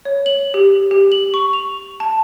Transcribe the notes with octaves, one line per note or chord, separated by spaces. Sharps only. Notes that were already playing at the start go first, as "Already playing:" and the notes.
C#5
F#7
G4
G4
F#7
C#6
F7
A5